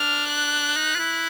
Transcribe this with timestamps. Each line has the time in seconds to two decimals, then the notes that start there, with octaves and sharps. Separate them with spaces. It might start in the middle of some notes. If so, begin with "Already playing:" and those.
Already playing: D4 F6
0.28 F#6
0.76 D#4
0.95 F4
0.99 E4